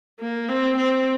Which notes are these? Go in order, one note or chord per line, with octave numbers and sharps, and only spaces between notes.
A#3
C4
C4